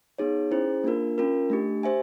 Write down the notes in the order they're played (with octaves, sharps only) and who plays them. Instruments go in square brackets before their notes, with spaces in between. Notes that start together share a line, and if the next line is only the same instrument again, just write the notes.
[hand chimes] B3 D#4 G#4 C#5
C#4 E4 G#4 C5
A#3 D4 F4 A#4
C#4 F4 A#4
A3 D4 G4
G4 C5 E5 G#5